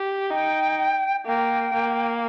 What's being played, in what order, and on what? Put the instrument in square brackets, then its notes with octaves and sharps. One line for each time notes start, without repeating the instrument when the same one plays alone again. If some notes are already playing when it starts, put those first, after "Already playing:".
Already playing: [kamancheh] G4
[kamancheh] D#4 [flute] G5
[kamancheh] A#3 [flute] G5
[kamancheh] A#3